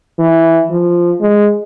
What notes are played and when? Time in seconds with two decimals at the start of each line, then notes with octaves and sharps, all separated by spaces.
0.19 E3
0.71 F3
1.21 G#3